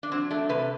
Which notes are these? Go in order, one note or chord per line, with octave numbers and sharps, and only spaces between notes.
D4
F#3 C4
A3 D4
C3 B4